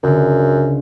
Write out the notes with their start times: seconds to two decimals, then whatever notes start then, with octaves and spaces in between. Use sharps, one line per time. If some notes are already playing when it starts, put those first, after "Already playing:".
0.03 C#2 F#2 D3